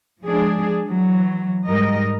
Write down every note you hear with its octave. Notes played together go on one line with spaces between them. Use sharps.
F3 G#3 D4 G#4
E3 F#3
G#2 G3 A#4 D#5